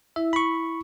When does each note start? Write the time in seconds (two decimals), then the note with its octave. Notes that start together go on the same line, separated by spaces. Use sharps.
0.16 E4 E5
0.33 B5 C#6